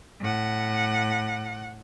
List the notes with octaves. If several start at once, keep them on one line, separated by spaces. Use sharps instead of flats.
A2 F#5